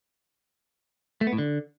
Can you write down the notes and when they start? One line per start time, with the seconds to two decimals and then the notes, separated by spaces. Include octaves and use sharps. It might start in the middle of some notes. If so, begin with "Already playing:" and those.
1.21 A3
1.27 B3
1.33 A2
1.38 D3